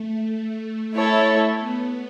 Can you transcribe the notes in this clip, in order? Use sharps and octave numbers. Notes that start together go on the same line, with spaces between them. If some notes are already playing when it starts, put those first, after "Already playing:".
Already playing: A3
E4 A4 C#5
B3